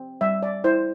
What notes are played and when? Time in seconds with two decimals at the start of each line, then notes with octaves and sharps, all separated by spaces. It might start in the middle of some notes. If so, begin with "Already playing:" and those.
Already playing: C4
0.21 G3 E5
0.43 D5
0.64 E4 C5